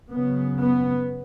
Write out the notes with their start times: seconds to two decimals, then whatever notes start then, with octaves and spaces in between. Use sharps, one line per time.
0.12 F#2 C#3 B3
0.60 B3